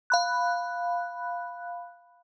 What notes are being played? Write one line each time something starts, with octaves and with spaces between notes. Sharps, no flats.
F5 B5 F#6